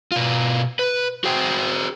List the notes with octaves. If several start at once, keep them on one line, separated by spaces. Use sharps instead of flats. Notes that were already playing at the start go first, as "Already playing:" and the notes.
B2 F4
B4
F#4 G#4 C5 G5